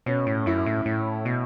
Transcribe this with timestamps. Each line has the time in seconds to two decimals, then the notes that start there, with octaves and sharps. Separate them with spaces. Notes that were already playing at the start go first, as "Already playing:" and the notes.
0.06 B2 C#4
0.27 A2
0.46 F#2 E4
0.66 A2
0.86 A2
1.25 B2